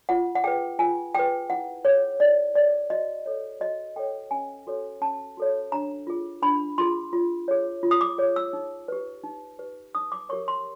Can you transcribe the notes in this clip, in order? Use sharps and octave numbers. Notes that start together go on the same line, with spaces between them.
F4 F#5
F#5
G#4 B4 G5
F4 G#5
G#4 B4 G5
E4 F#5
G#4 C#5
E4 D5
G#4 C#5 D5
F#4 D#5
A4 C#5
F#4 D#5
A4 C#5 G5
C#4 G#5
F#4 A4 C#5
C#4 A5
F#4 A4 C#5
D4 A#5
F4 G#4
D4 B5
F4 G#4 C6
F4
G#4 C#5
F4
D#6
D6
G#4 C#5
E6
D#4
G4 B4
D#4
G4 B4
D#4 D#6
D6
G4 A#4 C#5 C#6
C6